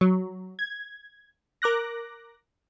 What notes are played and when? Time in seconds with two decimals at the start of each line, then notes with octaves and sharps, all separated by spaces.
0.01 F#3
0.59 G#6
1.62 A#4 D6 F#6 A#6